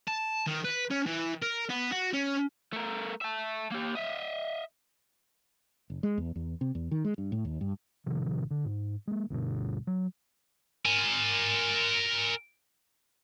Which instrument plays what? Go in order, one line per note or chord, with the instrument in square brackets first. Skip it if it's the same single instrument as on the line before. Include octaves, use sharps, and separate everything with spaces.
[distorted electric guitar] A5
D#3
B4
C#4
E3
A#4
B3
F#4
C#4
[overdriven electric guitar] A3 A#4
E5 A5
A#3 G4
D#5 E5
[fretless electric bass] F#1
G#3
E2
E2
C3
E2
D#3
G#3
G2
A2
D#2
G2
[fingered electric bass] A1 C3 D#3 F3
D3
G#2
G#3 A#3
D2 G2 B2
F#3
[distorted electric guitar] A#4 G#5